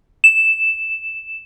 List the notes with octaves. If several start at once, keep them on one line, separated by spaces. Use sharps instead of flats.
E7